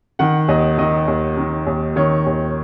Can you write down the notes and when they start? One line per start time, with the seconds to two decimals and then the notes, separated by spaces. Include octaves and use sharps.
0.19 D#3 F#5
0.48 D#2 D#5
0.78 D#3 D#5
1.08 D#2
1.37 D#3
1.67 D#2
1.96 D#3 C#5
2.26 D#2